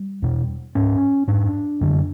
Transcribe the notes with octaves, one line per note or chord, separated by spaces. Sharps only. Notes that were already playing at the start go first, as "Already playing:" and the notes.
Already playing: G3
E2 B2
G#2 C#4
G#2 D4
F#2 D3